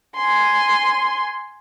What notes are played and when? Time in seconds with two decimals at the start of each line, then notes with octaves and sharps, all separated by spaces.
0.16 G#5 C6